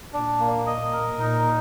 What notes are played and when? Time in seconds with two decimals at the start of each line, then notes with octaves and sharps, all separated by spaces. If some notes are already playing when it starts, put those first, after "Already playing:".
0.13 A#2 D4
0.40 A#3
0.66 D#5
0.93 A#4
1.19 A#2 D#4